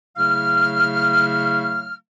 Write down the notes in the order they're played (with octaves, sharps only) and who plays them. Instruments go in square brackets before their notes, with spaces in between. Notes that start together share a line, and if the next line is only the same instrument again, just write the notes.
[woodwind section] C#3 F#3 A3 E4 F5 F6